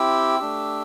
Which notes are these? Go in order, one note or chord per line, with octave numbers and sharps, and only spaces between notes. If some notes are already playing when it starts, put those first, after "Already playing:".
Already playing: C4 E4 G4 E6
A3 D4 G4